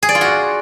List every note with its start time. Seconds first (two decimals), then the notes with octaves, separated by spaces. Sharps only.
0.03 G#4
0.09 D5
0.15 F4
0.21 F#4